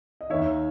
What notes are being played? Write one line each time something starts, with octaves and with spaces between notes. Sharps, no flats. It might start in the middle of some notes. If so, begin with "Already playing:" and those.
D#5
D#2 D#3 C#5 E5